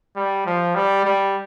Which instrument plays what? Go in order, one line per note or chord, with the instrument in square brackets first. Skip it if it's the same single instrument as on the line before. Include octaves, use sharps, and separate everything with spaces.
[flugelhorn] G3
F3
G3
G3